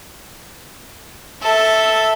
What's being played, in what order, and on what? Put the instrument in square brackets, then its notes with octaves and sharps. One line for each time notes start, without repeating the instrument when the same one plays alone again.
[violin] A4 E5